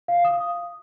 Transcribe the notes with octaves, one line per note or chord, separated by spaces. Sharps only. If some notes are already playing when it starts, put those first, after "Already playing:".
F5
D#6